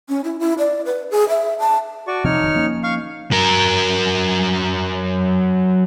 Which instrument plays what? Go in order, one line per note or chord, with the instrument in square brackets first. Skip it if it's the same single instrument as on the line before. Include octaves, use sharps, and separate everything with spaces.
[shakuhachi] C#4
E4
E4
D5
B4
G#4
E5
A5
[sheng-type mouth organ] F#4 D5 C#6
[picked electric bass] C3 F3 C4 [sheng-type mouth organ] D#4 C#5 F6
[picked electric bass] F1 D#3
F3 A#3 C#4
[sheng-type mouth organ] F5 C#6
[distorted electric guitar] F#3 A#4